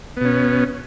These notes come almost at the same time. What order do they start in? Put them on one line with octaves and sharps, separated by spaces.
B3 B2 C#4